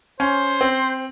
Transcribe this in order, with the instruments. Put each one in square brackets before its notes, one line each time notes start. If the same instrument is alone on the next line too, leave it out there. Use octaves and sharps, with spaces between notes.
[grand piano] C#4 [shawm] C5
[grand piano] C4